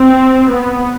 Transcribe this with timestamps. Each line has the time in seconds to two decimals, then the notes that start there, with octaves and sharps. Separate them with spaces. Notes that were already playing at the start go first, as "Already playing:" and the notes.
Already playing: C4
0.50 B3